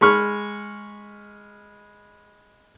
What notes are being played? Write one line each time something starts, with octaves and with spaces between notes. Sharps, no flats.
G#3 B5 C#6 F6